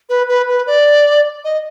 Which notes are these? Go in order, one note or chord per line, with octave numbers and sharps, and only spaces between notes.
B4
B4
B4
D5
D#5